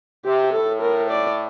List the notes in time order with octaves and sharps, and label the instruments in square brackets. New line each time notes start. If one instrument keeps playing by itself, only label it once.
[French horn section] C3 [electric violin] G4
[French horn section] A2 [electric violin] A4
[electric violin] A#4
D5